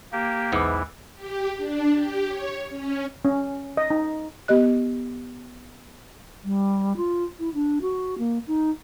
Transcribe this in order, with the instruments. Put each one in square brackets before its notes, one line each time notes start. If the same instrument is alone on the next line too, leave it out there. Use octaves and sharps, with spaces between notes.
[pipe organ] A#3 G4
[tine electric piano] B1 E2 D6 [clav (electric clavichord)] G#2 B3 E4 [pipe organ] E3
[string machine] G4
D4
G4
C#5
C#4
[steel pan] C#4
D#5
D#4
[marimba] B3 G4 D#5 F#6
[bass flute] G3
F4
E4
D4
F#4
A#3
D#4